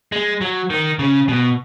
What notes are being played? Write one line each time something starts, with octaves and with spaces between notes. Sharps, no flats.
G#3
F#3
D#3
C#3
B2